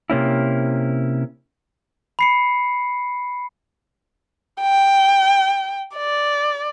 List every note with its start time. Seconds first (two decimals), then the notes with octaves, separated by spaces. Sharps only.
0.10 C3 A#3 C#4 E4
2.19 B5 C7 C#7
4.61 G5
5.96 D5